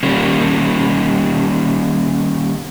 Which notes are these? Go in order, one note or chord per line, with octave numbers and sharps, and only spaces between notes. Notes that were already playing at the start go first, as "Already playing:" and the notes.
D#3 G3 A#3 C#4